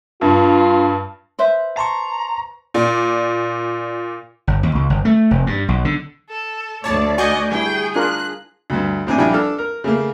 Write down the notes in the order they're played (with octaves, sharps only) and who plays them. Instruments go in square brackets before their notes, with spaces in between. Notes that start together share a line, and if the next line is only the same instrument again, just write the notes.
[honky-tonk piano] G2 [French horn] F4
[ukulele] B4 C5 E5
[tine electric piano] A5 C6 C#6 [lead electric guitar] A#5
[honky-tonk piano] A#2 D5
[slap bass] G1
D#2
C#2
G1
A3
F1
G2
B1
D3
[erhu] A4
[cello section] D2 D5 [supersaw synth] C#5 A5
[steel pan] F#4 [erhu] D#5 [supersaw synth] G#5 C#6 G6
[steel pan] G3 E4 [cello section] G#4 [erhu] G5
[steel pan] D4 F4 A#4 [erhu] F#6
[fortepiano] D2 G2
A2 C4 D4 G#5
A#1 G3 D4 E4 G5 G#5
D4 A4 F6
A#4
C#3 A3 A#3